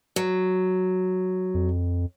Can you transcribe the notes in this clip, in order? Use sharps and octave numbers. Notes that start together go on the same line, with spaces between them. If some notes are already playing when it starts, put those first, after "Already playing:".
F#3
F2